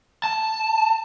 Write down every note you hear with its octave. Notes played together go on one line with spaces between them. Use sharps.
A5